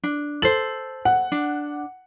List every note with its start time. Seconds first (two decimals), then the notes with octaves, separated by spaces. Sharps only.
0.03 D4
0.42 A4 C5 F#7
1.05 F#5
1.32 D4